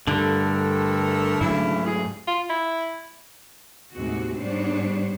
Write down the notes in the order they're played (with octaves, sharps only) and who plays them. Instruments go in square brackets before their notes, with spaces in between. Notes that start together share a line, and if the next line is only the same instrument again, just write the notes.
[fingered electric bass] G2 [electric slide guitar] D3 [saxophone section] A3 A4 A#4
[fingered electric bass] G#2 F#3 A3 [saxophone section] C#3 E4
[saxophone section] G#4
[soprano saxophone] F4
E4
[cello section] D#2 A2 C3 G#3 F#4
G#2 G3 B3 D4 C5 C#5